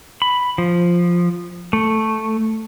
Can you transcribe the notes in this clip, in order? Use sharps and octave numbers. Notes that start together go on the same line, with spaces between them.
B5
F3
A3